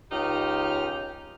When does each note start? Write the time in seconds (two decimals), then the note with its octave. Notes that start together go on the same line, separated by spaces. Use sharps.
0.11 C#2 D#4 G4 F6